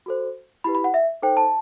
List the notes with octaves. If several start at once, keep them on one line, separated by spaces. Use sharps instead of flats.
F#4 A4 C5
E4 G4 B4 B5
B5
F#5
E5
D#4 A4 C5 G5
A5